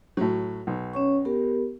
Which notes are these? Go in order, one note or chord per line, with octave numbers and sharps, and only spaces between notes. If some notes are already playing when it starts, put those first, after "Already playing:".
A2 F#3
B1
C#4 C#5 C#6
B3 G4 A#4